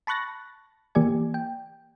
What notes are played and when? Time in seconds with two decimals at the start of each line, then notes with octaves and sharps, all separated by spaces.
0.07 A5 B5 C#6 F#6 A6 A#6
0.95 E3 A#3 G4 D5 G#5
1.34 G5